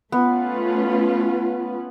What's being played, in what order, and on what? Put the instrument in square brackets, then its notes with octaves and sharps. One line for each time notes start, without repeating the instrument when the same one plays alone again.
[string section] A3 C#4 F4 B4 [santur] B3